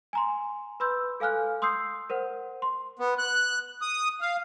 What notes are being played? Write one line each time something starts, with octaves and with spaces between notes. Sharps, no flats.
G#5 A#5 C6
B4 B5 C6 E6 G6
A4 F5 G#5 F6 F#6
C6 D#6 E6 G6 C7
A#4 C5 F#5
C6
B3
F#6
D#6
F5